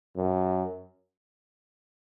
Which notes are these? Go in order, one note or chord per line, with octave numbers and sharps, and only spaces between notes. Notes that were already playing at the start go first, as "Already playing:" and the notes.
F#2